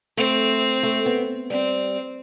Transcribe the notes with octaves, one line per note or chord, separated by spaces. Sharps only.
A3 C4
A3
B3
G3 C4